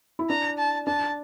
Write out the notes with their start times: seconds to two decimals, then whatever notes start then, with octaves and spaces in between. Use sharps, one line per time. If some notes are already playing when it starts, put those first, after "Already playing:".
0.19 E4
0.30 D4 A#5
0.58 A5
0.87 D4 A5